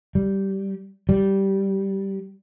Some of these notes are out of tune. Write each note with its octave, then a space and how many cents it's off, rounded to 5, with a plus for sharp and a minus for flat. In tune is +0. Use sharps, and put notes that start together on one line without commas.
G3 -10
G3 -10